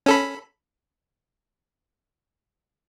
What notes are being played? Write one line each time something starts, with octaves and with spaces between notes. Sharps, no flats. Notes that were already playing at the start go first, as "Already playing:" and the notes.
C#4 A4 B5